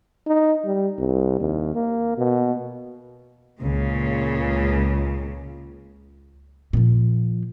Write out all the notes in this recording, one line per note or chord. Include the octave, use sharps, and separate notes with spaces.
D#4
G3
C2
D#2
A#3
B2
C#2 A#2 C#3
A#2 F3